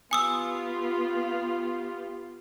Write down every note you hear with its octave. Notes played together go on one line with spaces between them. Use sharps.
B3 F4 G4 G#5 D#6 E6